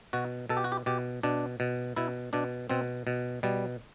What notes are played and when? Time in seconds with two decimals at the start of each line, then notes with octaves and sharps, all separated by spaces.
0.13 B2 F#4
0.49 B2 A4
0.57 G4
0.64 F#4
0.72 G4
0.86 B2 G4
1.23 B2 D4
1.60 B2
1.96 B2 E4
2.33 B2 D4
2.70 B2 C4
3.07 B2
3.43 B2 G3